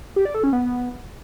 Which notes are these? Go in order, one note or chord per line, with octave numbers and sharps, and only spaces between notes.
G4
D5
A4
C#4
B3